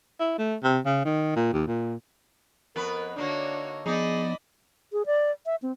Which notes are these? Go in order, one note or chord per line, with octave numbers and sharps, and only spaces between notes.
E4
A3
C3
C#3
D#3
A#2
D#2
A#2
F2 B3 A#4 B4
D3 A#3 D4 D#4 F#4 C#5
F3 B3 D#4 G#4 D5 D#5 B5
G#4
D5
E5
C4